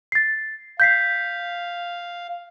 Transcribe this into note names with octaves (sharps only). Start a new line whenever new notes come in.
A6 C7
F5 G6 B6 C7